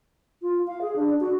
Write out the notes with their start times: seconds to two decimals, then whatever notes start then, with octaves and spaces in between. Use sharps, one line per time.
0.42 F4
0.67 F5
0.81 G#4
0.96 D4
1.20 F#4